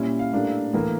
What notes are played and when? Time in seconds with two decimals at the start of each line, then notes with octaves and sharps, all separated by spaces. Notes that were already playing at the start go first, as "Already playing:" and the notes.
Already playing: A#2 G3 C#4 E4
0.19 F5
0.33 A2 G3 A#3 D4 F5
0.73 A2 E3 A#3